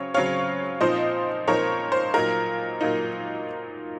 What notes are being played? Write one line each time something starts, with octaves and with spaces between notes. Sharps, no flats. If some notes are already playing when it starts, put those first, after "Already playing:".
Already playing: C#3 F#3 C4 C#5
C#3 F#3 C4 C#5 F5
A#2 F3 C4 D#4 C5 D#5
A#2 F3 C4 D#4 A#4 C#5
C5
A#2 F#3 A#3 D#4 A#4
A#2 F#3 A#3 D#4